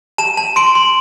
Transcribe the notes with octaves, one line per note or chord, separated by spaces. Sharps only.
A5 E7
A5
C6 D7
C6